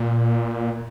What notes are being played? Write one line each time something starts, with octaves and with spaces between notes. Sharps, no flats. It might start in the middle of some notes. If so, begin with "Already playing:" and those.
Already playing: A#2